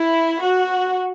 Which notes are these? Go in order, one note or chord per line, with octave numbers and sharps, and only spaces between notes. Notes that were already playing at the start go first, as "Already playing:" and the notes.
Already playing: E4
F#4